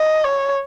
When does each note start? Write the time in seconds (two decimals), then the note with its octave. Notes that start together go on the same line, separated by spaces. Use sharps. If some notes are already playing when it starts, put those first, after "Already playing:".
Already playing: D#5
0.24 C#5